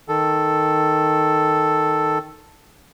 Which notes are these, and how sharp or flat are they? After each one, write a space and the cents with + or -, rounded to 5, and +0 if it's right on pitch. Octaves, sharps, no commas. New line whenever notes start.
D#3 +0 A4 +0